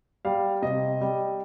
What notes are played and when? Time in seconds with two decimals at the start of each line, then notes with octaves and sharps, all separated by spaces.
0.25 G3 F5
0.62 C3 D#5
1.01 G3